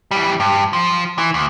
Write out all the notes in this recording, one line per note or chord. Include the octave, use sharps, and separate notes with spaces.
E3 G3
G2
F3
E3
D2